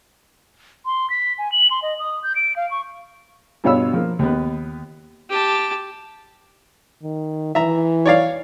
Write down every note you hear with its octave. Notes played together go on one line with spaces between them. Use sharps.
C6
B6
G#5
F#7
C6
D#5
D#6
G6
D7
F5
C#6
G2 B2 F4 C#5 B5 E6
F3 A#3
D#2 B3
G4 A5
D#3
E3 E5 A#5
C#5 D5 F5